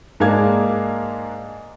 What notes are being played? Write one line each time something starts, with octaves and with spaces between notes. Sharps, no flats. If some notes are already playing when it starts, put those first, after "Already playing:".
G#2 G#3 A#3 D4 F5 G#6